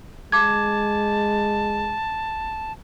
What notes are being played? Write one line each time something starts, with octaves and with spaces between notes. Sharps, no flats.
G#3 A5 D6 G#6